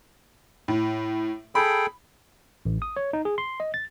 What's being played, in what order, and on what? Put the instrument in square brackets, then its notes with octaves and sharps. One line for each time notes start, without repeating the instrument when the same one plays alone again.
[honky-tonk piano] A2
[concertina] G#4 A4 G5 [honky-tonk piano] B5
[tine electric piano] A1
D#6
C#5
D#4
G#4
C6
D#5
A6